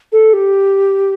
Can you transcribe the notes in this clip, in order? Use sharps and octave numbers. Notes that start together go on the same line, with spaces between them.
A4
G4